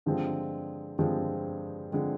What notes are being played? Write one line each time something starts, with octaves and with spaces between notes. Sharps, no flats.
G2 D3 F3 G#3 C4
G2 D3 F3 G#3 C4
D3 F3 G#3 C4